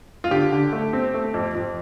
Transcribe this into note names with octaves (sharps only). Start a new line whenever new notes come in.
F4
D3 G4
D3
A3
C4
A3
F2
F2